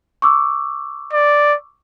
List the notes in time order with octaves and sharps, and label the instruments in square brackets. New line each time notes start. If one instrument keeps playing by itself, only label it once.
[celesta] C#6 D6 E6
[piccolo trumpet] D5